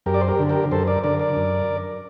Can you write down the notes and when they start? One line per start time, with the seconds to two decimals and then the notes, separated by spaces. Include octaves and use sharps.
0.06 F#2 G4 A#4
0.14 D5
0.21 C5
0.28 G4 A#4
0.39 D3
0.49 G4 A#4
0.71 F#2 A4 C5
0.87 A#4 D5
1.04 D3 A#4 D5
1.20 A#4 D5
1.36 F#2